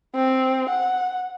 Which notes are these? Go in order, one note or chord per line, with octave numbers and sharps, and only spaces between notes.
C4
F#5